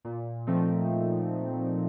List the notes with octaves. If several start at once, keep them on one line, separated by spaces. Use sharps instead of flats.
A#2
F3 A3 C4 D#4